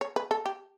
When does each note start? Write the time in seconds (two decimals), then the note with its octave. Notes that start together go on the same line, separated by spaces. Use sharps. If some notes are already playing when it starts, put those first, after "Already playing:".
0.01 C#5
0.16 B4
0.31 A4
0.46 G4